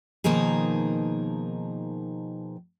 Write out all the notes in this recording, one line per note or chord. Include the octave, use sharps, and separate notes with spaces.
B2 D#3 F3 A#3 D#4 G#4